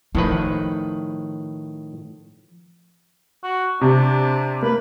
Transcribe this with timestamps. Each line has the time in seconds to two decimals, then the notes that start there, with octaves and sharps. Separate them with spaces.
0.15 A2 D#3 F3 B4
3.43 F#4
3.81 C3 D4
4.63 A#3 B4